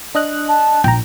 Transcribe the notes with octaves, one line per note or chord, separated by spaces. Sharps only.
D4 D#5 F#6
A5
A#1 G5 A#5